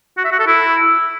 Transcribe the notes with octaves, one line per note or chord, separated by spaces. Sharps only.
F#4
E5
F#4
A4
E4